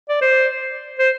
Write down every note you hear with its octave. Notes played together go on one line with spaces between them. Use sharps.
D5
C5
C5